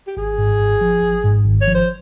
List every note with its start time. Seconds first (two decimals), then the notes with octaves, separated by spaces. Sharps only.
0.07 G4
0.17 G#1 G#4
0.38 G#2
0.59 G#1
0.81 F3
1.02 G#1
1.24 G#2
1.46 G#1
1.61 C#5
1.68 F3
1.74 C5